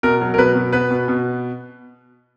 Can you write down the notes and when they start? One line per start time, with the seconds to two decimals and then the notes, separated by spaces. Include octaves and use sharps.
0.03 B2 A#4
0.21 F#3
0.34 A#4
0.38 B2 B4
0.55 B2
0.73 B3 B4
0.91 B2
1.08 B2